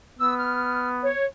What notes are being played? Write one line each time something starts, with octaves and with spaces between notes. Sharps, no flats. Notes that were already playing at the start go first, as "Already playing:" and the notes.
B3 E6
F6
C#5